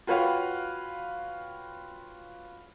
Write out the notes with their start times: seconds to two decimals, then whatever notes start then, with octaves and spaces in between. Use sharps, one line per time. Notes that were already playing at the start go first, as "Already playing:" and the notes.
0.07 F4 F#4 B4 C#5 F5 G5